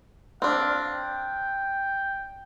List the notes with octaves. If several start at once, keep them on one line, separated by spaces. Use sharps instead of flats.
C4 D4 F5
G5